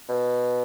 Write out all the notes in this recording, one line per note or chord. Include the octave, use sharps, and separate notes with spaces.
B2